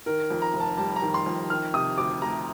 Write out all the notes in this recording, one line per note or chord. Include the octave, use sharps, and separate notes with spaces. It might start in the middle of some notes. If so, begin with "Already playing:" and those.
D#3 A#4
F2
A#5
F1
A5
G3 A5
A#5
D#3
C6
F2
D#3 F6
C3 D#6
D2 D6
A3 A#5